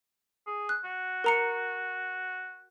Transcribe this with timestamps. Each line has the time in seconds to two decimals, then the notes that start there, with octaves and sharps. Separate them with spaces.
0.47 G#4
0.69 F#6
0.84 F#4
1.24 A#4 A#5 C#7